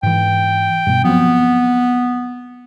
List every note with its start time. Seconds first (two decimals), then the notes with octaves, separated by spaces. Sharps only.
0.03 G#2 E3 G5
0.87 G2 B2
1.05 F3 F#3 B3 C4